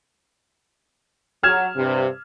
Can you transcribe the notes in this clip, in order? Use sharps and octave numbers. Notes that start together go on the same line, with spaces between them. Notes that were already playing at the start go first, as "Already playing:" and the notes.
F#3 F6 G#6 E7
G2 C3